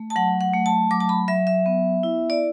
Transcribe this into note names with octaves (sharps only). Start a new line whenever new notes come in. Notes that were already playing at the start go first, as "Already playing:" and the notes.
Already playing: A3
A5
F#3 F#5
F#5
A3
A5
F#3 D6
A5
B5
F#3 E5
E5
B3
E4
D5